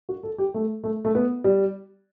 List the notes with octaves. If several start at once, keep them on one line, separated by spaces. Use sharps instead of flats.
F#4
A4
G4
A3
A3
A3
B3
G3